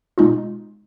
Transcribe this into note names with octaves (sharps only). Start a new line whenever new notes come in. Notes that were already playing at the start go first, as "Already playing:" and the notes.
B2 G#3 D#4 F4